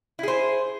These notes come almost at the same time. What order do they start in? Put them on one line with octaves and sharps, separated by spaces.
E4 G#4 C5